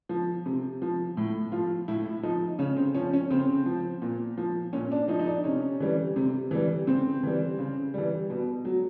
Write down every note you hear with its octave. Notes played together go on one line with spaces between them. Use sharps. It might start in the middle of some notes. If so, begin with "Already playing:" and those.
F3
C3
F3
A2
F3 F4
A2 E4
E4
F3 D#4
C#3 C#4
C4
F3 C#4
C#4
C#3 C4
F3
A#2
F3
A#2 C#4
D4
F3 D#4
D#4
D4
C3 C#4
E3 G3
C3
E3 G3
C#3 C4
E3 G3
C#3
E3 G3
B2
F#3